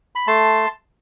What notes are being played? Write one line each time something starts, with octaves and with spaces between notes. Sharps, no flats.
B5
A3 A5 C6